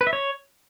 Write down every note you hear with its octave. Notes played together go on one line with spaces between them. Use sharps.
B4
E5
C#5